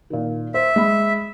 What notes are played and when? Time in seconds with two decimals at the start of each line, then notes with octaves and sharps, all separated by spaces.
0.10 A#2 D#3
0.54 C5 E5
0.76 G#3 B5